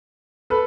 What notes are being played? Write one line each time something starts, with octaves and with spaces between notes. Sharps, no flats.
A4 B4